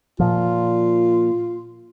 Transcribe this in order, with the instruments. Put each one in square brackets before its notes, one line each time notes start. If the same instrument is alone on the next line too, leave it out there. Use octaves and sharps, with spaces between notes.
[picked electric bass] A#2 F3 [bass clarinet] F4